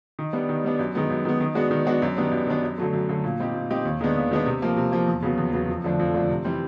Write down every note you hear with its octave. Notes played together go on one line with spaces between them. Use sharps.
D#3
G3 B3 D4
D#3
G3 B3 D4
F#2
D#3 G#3 B3
F#2
D#3 G#3 B3
D#3
G#3 B3 D4 F#4
D#3
G#3 B3 D4 F#4
F#2
D#3 G3 B3 D4
F#2
D#3 G3 B3 D4
F#2
D3 F#3 A3
F#2
D3 F#3 A3
A#2
G3 C4 D#4 G4
A#2
G3 C4 D#4 G4
D#2
D#3 G#3 B3 D4
D#2
D#3 G#3 B3 D4
C3
F3 A#3
C3
F3 A#3
E2
C#3 F#3 B3
E2
C#3 F#3 B3
F2
D3 F3 A3 D4
F2
D3 F3 A3 D4
C3
E3 G3 C4